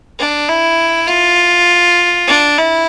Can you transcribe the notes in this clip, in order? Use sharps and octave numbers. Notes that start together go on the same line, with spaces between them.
D4
E4
F4
D4
E4